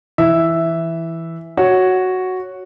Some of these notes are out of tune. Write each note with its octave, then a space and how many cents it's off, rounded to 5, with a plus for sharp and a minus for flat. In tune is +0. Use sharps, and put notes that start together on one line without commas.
E3 +0 E5 +0
F#4 +0 C#5 +0